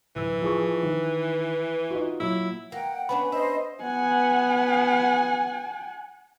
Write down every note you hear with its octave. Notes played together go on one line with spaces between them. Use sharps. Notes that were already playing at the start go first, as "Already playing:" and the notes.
D1 E3 E6
F3 G#4 C#6
D#3
D#4 F4 F#4
A#2 F#3 E4
A#3 F#5 G5
B3 C#4 D4 B4 B5
C5 D#5 E5
B3 F#5 G#5